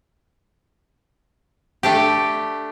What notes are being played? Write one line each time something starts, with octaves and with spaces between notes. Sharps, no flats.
A3 D4 G4